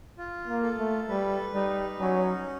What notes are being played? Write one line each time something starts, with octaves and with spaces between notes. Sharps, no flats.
F4
A#3
A4
A3
G3 B4
G3 D#4
F#3 C#4